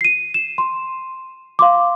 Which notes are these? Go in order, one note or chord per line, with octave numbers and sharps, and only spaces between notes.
C7 D#7
E7
C6
F5 C6 D6